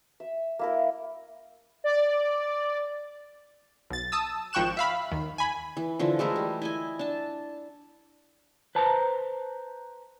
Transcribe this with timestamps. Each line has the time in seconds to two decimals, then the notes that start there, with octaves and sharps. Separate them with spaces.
0.20 E5
0.59 A#3 E4 A#4
1.84 D5
3.90 B1 A6
4.12 A5 D#6 E6
4.53 G#1 F3 G5 C#6 F#6 E7
4.77 E5 F5 B5
5.12 D#2
5.38 G#5 B5
5.77 E3
5.99 D3 E3 F3
6.19 G#3 A3 E4 A#4
6.36 G3
6.62 E4 D#5 G#5
6.99 D4 A5
8.75 B4 C5 A5 A#5